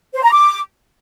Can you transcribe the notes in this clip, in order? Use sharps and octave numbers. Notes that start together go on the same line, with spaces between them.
C5
A#5
D6